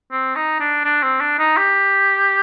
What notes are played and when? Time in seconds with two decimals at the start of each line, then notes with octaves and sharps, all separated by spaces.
0.12 C4
0.36 D#4
0.60 D4
0.85 D4
1.03 C4
1.21 D4
1.39 D#4
1.57 G4